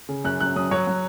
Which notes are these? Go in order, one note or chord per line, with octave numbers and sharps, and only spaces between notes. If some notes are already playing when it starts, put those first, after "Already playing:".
C#3
F#2 F#6
F#3 F#6
F#2 D#6
F#3 C#5
F#3